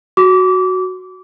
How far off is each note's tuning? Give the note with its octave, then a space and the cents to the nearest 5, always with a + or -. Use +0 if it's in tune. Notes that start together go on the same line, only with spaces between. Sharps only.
F#4 +0 D6 -25